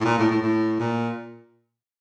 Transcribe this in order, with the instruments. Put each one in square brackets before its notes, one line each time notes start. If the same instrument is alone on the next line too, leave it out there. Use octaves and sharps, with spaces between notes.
[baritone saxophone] A2
A#2
A2
A2
A2
A#2